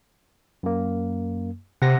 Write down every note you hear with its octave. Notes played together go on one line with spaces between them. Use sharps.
F#2 A#3
C3 F#5 A#6